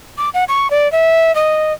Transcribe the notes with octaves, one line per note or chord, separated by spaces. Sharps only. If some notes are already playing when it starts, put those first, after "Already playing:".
D6
F#5
C#6
D5
E5
D#5